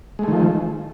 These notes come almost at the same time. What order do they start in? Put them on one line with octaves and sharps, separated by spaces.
G#3 A3 D#3 F3